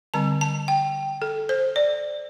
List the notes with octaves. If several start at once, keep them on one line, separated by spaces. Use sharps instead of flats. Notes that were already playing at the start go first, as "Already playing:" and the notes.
D3 G3 C4 A5
A5
G5
A4
C5
D5